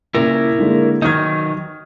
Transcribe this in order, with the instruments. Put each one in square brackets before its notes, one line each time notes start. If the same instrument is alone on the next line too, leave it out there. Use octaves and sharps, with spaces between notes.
[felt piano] A#2 C#3 [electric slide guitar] E4 A#4
[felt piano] D3 G#3 A#3
[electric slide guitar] D#3 F#3 D#4 [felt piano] D#6 F6 G#6